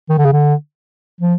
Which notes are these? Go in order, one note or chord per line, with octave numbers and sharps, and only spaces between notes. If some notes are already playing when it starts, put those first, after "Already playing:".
D#3
D3
C#3
D3
F3